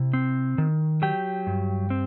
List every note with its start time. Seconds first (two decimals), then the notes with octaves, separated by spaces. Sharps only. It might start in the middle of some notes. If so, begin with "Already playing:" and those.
Already playing: C3 E4
0.14 C4
0.58 D#3
1.02 F#3 G4 G5
1.47 G2
1.90 C4